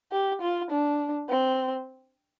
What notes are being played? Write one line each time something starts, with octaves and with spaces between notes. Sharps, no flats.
G4
F4
D4
C4